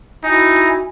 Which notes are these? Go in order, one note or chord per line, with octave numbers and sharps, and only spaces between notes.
D#4 E4 F#4 G5 G#5